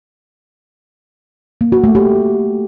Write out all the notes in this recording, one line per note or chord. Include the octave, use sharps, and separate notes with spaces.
A#3
F#4
A3
G4